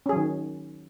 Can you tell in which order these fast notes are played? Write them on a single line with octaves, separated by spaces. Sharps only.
C#4 G#4 F#3 D#3